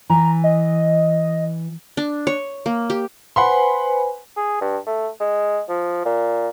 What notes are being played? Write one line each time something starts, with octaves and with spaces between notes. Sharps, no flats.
E3 A#5
D#5
D4
C#5
A#3
G4
B4 C5 F#5 G#5 B5 C6
G#4
G2
A3
G#3
F3
A#2